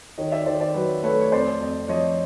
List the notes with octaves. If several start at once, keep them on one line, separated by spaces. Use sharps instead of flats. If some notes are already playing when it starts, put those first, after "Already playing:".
D#3 C#5 D#5
D5 E5
D#3 C5 D5
C5 D5
F#3 B4 C#5
A3 B4 C#5
C#5
F2 C5 D5
F2
F3 C#5 D#5